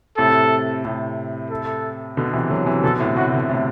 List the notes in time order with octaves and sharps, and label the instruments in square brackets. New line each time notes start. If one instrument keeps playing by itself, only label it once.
[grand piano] A2 C3 [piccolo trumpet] A4
[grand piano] A2 C3
[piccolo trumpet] A4
[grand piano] B2 D3
C3 E3
D3 F#3
C3 E3
[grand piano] B2 D3 [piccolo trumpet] A4
[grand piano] A2 C3
[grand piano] A2 C3 [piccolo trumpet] F#4
[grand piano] B2 D3
A2 C3